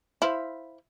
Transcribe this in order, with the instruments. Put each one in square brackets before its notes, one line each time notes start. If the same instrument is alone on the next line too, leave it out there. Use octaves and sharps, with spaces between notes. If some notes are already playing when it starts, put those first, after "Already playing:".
[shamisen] E4 [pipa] C5 F5 B5